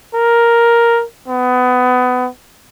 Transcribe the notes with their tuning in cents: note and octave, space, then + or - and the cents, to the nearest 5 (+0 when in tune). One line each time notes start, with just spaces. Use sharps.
A#4 +5
B3 +25